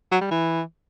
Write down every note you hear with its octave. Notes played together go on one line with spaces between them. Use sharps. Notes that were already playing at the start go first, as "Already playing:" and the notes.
F#3
G3
E3